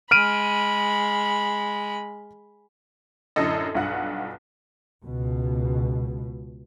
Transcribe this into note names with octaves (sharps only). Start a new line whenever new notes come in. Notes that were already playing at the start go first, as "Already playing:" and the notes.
G#3 B5 F6 D7 D#7
F#2 A2 D3 A4 D#5
B1 G2 F4 F#5 F#6
C#2 B2